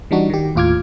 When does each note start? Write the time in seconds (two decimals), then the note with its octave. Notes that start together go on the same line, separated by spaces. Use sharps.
0.11 E3 G3 D4 D#4 F#4
0.30 D#3 G4
0.55 D#2 A2 F4 D6 F6 G#6